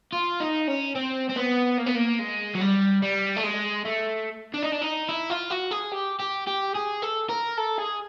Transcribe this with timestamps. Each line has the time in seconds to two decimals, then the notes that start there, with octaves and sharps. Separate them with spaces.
0.13 F4
0.40 D#4
0.68 C#4
0.95 C4
1.30 C4
1.37 B3
1.78 A#3
1.87 B3
1.95 A#3
2.19 G#3
2.55 F#3
2.61 G3
3.02 G3
3.37 A3
3.44 G#3
3.85 A3
4.54 D4
4.63 D#4
4.72 D4
4.81 D#4
5.09 E4
5.30 F4
5.51 F#4
5.71 G#4
5.92 G4
6.19 G4
6.47 G4
6.75 G#4
7.02 A4
7.29 A#4
7.58 A4
7.78 G#4